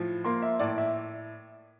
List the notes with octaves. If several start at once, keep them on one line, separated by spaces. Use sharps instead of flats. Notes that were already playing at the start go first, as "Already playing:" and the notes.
Already playing: A2 F3
A#3 C6
E5
A2 D5
E5